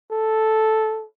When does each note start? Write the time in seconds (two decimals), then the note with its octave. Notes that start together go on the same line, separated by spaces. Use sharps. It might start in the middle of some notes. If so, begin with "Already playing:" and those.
0.12 A4